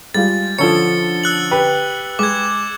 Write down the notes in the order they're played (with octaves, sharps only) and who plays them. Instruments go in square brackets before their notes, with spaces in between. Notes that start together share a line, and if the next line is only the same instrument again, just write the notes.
[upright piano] G3 G#3 F4 [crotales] A6
[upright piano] D3 C#4 [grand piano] F3 A4 C#5 [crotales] C#7 G7
[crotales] E6 F#6 F#7
[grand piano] G4 B4
[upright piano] G#3 [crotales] D6 G#6